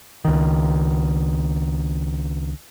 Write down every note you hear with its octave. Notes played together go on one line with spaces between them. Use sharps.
C#2 D#3